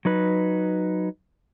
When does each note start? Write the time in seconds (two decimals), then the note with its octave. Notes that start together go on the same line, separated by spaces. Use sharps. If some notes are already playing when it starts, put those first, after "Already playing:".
0.05 F#3 D#4 B4